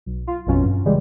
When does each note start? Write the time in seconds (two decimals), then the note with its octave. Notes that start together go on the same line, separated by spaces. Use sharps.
0.06 B1
0.27 F4
0.46 A1 F2 B2 F#3 C#4 F4
0.63 G2
0.85 C#3 E3 G3 G#3